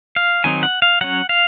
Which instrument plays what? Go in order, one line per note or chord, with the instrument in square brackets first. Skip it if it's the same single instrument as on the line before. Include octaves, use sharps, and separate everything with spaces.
[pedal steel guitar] F5
D#3 F#3 C4 D#4 G#5
F#5
F5
F#3 C#4 F#5
F5